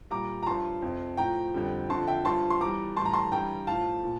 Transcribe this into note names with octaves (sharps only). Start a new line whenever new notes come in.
A#2 G3 A#5 D6
A#5
G2 F3 A5 C6
F2 C3 F3
A2 F3 G5 A#5
F2 D3 G3
F2 D3 F3 A5 C6
E5 G5
G2 F3 A5 C6
C6
E2 E3 G3 A#5 D6
A2 E3 G3 A5 C6
A#5
A5 C6
G2 E3 G3 G5 A#5
A2 F3 F5 A5
A#2